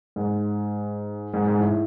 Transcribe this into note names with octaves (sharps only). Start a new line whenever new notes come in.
G#2
G#2
G#2
A2